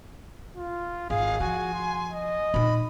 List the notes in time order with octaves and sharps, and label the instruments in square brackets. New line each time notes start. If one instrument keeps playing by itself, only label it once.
[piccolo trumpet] F4
[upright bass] G#1 [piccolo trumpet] G#4 [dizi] F5
[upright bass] F3 [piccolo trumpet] F#4 [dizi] G#5
[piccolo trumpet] C6
D#5
[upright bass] A#2 D#4 [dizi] B5